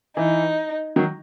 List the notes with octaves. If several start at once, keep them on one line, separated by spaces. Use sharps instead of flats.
E3 D#4
D#3 F#3